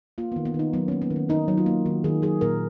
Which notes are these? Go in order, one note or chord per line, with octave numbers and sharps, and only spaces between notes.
A#3 F4
B3
D#3
B3
D#3
D#4
F#3 B3
C#4
A#3
B3
D#3
C#4
D#3 D#4
F#3
F4
A#3
D#3 F#4
D#3 G#4
F#3 G#4
A#2 A#4